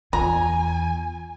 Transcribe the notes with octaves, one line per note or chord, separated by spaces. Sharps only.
E2 F4 G#5 A#5